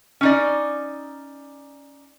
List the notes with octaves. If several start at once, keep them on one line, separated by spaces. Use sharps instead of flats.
C#4 D#4 D5